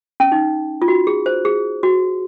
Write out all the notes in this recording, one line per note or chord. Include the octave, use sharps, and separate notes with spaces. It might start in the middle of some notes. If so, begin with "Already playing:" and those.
C#4
D#4
F4
F#4
G#4
C5
G#4
F#4